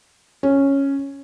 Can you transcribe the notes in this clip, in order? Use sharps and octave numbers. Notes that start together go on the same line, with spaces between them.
C#4